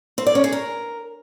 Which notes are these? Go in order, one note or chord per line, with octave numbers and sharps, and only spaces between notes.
C4
D5
C#4
G#4
A#4